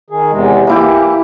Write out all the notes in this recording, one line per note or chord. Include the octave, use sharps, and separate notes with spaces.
D#3 G#4
E2 C3 G#3
E3 A#3 E4 G4